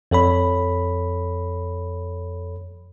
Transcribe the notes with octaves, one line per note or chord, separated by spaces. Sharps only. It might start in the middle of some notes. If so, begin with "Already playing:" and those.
F2 A4 C#5 B5